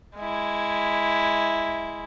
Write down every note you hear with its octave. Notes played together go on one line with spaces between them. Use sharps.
G#3 E4